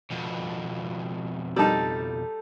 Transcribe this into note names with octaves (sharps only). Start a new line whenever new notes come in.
F2 B2
G3 D#4 A4 A5